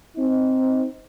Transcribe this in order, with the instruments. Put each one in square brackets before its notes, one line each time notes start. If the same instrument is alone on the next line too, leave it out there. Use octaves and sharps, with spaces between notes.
[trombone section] C4 D#4